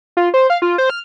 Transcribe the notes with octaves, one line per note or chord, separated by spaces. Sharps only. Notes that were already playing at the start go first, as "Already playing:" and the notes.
F4
C5
F5
F4
C5
F6